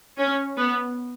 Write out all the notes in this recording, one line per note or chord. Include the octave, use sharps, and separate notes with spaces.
C#4
B3